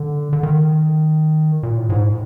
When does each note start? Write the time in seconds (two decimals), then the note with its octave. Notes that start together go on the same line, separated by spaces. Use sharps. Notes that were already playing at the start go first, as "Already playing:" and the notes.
Already playing: D3
0.33 D3
0.43 D#3
1.63 A#2
1.77 A2
1.89 G#2
2.03 A2